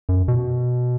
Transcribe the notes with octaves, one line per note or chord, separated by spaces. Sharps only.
F#2
B2